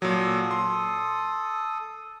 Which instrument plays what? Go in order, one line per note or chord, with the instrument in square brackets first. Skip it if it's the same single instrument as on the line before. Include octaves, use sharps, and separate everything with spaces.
[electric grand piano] A#2 F#3 [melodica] A4 D#6
[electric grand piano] C6